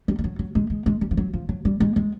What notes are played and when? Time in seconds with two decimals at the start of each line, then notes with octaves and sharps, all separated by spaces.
0.08 G3
0.19 G3
0.24 F#3
0.39 F#3
0.55 G#3
0.70 G#3
0.86 G#3
1.01 G3
1.11 F3
1.17 F#3
1.33 F3
1.49 F#3
1.65 G3
1.80 G#3
1.96 G#3